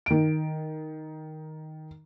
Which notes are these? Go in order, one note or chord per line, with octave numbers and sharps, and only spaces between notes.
D#3 D7